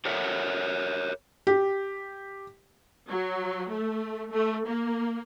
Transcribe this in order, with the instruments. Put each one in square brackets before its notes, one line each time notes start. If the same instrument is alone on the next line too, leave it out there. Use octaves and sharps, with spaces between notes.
[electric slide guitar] G4 A4 A#4 C#5 E5 F#5
[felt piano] G4
[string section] F#3
A3
A3
A#3